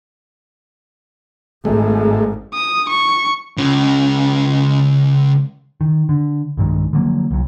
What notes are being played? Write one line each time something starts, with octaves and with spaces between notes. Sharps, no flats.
G#1 G#2 G#3 A3
D#6
C#6
C#2 C#3
D#3
D3
B1 G2 D#3 G#3
D3 F3 F#3 A#3
C2 F#3